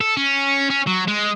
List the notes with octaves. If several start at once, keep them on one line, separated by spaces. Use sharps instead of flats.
A4
C#4
C#4
F#3
G#3